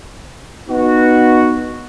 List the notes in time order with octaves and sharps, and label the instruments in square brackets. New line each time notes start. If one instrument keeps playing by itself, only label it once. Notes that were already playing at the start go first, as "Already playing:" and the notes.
[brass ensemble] B3 D#4 F#4